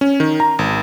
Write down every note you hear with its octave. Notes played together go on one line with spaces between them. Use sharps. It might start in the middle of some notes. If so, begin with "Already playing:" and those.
C#4
D#3
A#5
G#1